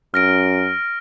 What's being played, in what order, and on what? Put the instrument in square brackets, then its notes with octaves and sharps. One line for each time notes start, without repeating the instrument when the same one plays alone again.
[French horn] F#2 [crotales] F6 A#6 D7